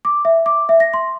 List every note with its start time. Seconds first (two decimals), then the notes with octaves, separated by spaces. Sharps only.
0.05 D6
0.25 E5
0.46 D6
0.69 E5
0.80 A#6
0.94 C6